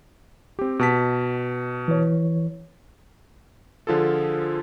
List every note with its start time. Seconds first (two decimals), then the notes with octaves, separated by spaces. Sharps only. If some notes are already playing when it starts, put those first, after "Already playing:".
0.59 C4 G4
0.79 B2 A5 B6
1.88 E3 C#5
3.87 D3 F3 F4 G#4 A4